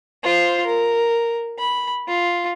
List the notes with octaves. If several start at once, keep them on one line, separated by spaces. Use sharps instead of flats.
F4 C5
A#4
B5
F4